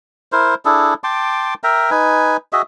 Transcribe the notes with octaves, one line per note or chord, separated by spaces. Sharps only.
E4 A#4 C5
D4 E4 G#4 A4
G5 A5 C6 D6
A#4 E5 G5 A#5
D#4 B4 G#5
F#4 G#4 D#5 E5